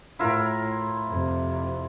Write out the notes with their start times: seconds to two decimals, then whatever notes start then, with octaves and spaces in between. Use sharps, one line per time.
0.19 A2 E4 F4 A#4
1.08 F2 C3